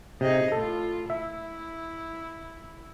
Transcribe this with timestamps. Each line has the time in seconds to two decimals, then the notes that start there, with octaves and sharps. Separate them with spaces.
0.21 C3 D#4 G#4 D#5
0.52 A2 F4 A4
1.10 E4 E5